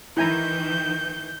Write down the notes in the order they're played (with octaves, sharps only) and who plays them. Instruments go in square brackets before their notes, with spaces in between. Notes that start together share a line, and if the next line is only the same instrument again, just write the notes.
[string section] D#3 E3 [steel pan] E4 G#5 A#5 [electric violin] G6